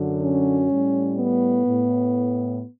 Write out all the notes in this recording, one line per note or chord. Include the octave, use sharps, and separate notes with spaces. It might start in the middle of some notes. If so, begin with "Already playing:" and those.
Already playing: F#2 D3 F#3
C#4
A2 G3
B3
A2